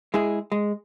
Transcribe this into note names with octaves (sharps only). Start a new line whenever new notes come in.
G#3 E4 G#4
G#3